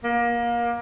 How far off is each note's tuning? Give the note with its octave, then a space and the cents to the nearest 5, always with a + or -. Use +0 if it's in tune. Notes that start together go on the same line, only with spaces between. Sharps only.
A#3 +25